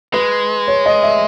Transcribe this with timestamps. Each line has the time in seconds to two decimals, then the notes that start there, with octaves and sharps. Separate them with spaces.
0.13 G#3 B4
0.68 C#5
0.86 D#5
1.03 E5